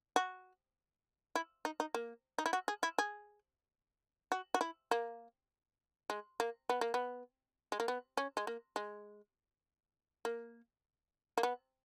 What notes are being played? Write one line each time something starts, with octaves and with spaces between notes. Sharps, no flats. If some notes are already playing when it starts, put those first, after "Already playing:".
F#4
E4
D#4
D#4
A#3
D#4
E4
F#4
G#4
E4
G#4
F#4
F#4
E4
A#3
G#3
A#3
B3
A#3
B3
G#3
A#3
B3
C#4
G#3
A#3
G#3
A#3
A#3
B3